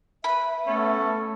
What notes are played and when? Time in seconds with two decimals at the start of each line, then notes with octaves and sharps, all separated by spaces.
0.24 B4 E5 B5
0.67 A3 B3 C#4 A4